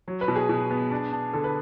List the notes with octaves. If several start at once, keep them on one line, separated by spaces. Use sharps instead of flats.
F#3
B4
B2
G#4
B2
B3
D4
D4
D3 A4
B4